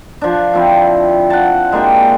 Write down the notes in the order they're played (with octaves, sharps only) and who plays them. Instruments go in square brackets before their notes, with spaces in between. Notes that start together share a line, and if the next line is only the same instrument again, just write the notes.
[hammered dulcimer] F3 D4
F3 C4 E4
F#5 A5
G#3 A#3 D4 G4